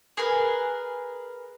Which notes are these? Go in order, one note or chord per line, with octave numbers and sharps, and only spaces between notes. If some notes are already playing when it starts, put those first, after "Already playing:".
G#4 A#4 B4